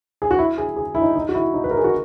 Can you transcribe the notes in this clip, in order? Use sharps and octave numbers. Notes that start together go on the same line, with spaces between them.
G#4
F#4
E4
G#4
G#4
E4
D#4
D#4
F#4
E4
D#4
B4
A#4
G#4
F#4